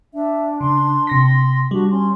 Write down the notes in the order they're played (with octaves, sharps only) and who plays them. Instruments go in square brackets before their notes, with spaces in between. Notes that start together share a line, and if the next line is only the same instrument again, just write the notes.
[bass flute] D4 [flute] E5
[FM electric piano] C#3 [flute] C6
[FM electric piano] C3 A#6 B6
[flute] C6
[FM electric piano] G3 [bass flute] D4 [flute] F#4
[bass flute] C#4 [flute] C6